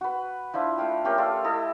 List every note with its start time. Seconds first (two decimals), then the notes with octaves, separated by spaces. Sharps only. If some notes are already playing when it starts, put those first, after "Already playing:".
0.01 F#4 B4
0.54 F3 D4 E4 F4
0.78 A3 F5 G5
1.05 A3 C#4 G4 A#4
1.18 F4 A4 D5 F5
1.44 E4 A4 D#5